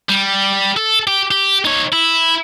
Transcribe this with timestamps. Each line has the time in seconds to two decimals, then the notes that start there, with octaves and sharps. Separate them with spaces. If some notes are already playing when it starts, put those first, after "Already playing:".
0.09 G3
0.77 A4
1.07 G4
1.31 G4
1.65 D#4 C#5
1.92 E4